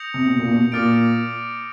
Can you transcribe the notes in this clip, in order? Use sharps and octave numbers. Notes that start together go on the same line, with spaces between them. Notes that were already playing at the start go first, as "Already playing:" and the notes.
Already playing: D#6 G6 A#6 C#7 F7
C3
B2
A#2
B2
A#2 D6 F6 A6 D7